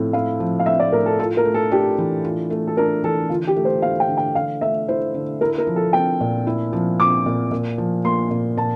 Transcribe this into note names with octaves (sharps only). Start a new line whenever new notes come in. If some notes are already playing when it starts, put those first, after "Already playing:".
Already playing: A2 F3 C4 E4
E4 F5
F3
F5
C4 E5
D5
A2 A#4
A4
F4 A4
A#4
A3
A4
D4 G4
E3
F4
A3
A4
D4 A#4
E3 A4
D3 F4
G4
A3
C5
E4 F5
G5
D3
G5
D3 F5
A3 E5
E4 C5
D3
E4 A#4
A#4
F3
A4
C4 G5
A#2
E4
F3
C4 D6
A#2
A#2
F3
A#3 C6
A#2
A#2 A5